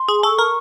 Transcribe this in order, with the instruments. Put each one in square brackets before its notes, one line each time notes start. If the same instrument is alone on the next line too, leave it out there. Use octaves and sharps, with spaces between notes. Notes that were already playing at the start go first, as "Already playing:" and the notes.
Already playing: [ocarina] C6
[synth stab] G#4
[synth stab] A4 [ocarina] C#6
[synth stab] A#4